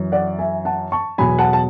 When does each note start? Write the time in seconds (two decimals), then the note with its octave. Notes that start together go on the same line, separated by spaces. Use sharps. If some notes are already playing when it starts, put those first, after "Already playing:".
Already playing: F#2 E3
0.12 D5 F#5
0.39 E5 G#5
0.65 F#5 A5
0.92 A5 C#6
1.18 E2 B2 F#3 G#5 B5
1.38 F#5 A5
1.53 A5